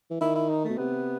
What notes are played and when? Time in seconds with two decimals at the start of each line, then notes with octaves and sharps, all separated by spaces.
0.10 E3
0.21 D#3 E4
0.35 E4
0.50 D#4
0.64 B2 A3
0.78 C3 B3